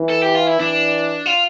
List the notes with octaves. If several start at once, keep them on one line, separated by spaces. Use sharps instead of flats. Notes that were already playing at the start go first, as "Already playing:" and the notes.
Already playing: E3
A4
G4
F4
E4
E3 D4
F4